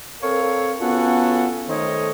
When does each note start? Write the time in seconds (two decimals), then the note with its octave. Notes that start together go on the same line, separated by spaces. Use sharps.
0.22 C4 A4 A#4 C#5 F5
0.80 B3 C#4 F4 F#4 G#4 A4
1.69 D#3 A3 A4 C5 C#5 D#5